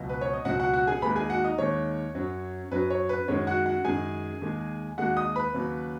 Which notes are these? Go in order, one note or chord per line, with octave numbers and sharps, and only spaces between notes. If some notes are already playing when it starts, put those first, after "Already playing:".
Already playing: C#2 B2 F#3 D#5
B4
C#5
D#5
C#2 B2 F#3 F#4 F#5
F#4 F#5
F#4 F#5
G#4 G#5
D#2 D#3 G#3 B4 B5
G#4 G#5
F#4 F#5
D#4 D#5
D#2 D#3 G#3 C#5
F#2 F#3
F#2 F#3 B4
C#5
B4
F#2 D#3 G#3 C#5
F#4 F#5
F#4 F#5
F#2 D#3 G#3 G#4 G#5
D#2 D#3 G#3
D#2 D#3 G#3 F#4 F#5
D#5 D#6
B4 B5
D#2 C#3 F#3